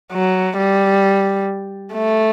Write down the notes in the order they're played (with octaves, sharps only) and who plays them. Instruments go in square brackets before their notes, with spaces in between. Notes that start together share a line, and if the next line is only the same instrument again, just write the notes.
[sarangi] F#3
G3
A3